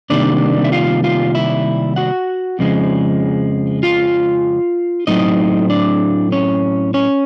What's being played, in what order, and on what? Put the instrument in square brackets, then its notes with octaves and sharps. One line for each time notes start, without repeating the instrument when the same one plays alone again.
[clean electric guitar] C3 D#3 G3 A#3 D4 D5
E5
F4 F5
F4 F5
E4 E5
F#4 F#5
F2 C#3 F3 G#3
F4 F5
A2 F#3 A3 C4 D#4 D#5
D4 D5
C#4 C#5
C#4 C#5